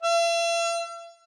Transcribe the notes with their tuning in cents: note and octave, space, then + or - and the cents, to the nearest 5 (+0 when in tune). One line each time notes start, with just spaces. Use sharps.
E5 +45